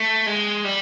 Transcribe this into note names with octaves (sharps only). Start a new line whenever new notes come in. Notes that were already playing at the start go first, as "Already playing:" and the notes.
Already playing: A3
G#3
G3